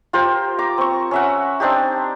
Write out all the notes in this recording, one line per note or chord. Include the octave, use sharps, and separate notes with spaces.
F4 G4 A#4 C5
A#5 D6
C4 C#6
C#4 E5 F#5
C4 D4 D#4 G4